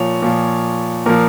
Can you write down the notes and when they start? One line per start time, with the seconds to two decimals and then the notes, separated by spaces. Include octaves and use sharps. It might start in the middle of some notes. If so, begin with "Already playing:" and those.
Already playing: A#2 F3 C#5
0.22 A#2 F3
1.06 A#2 F3 A#4